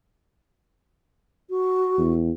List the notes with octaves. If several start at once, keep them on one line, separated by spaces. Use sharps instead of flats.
F#4
E2